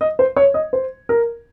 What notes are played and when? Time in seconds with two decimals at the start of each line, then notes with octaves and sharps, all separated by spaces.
0.01 D#5
0.19 C5
0.36 C#5
0.54 D#5
0.73 C5
1.09 A#4